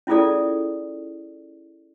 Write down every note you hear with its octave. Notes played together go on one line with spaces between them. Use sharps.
C#4 E4 F4 G#4 A4 D5